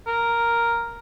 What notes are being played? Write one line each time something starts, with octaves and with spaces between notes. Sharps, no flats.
A#4